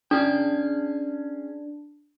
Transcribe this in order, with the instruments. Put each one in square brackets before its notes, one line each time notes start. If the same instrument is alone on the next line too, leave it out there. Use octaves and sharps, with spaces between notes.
[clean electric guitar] C#4 G#4 G5 [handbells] D4